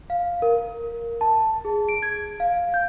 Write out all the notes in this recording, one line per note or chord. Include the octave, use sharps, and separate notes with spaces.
F5
A#4
A5
G#4
D7
G#6
F5
G6